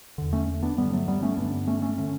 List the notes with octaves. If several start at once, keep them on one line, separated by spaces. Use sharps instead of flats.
E2 D3
A3 C#4
B3 D4
G2 D3 G3 B3
F#3 A3
G3 B3
A3 C#4
G2 D3 B3 D4
A3 C#4
A3 C#4
D3 A3 C#4